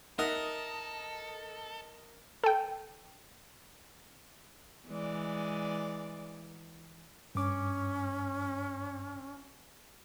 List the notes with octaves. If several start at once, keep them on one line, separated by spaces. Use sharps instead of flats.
D#4 A4 A#4 D#5 E5 F#5 D#6
A4 G5
E3 G#3 D5
G2 C#4 D6